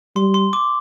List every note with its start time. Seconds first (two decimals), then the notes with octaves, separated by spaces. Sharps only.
0.16 G3 C6
0.34 C6
0.53 D6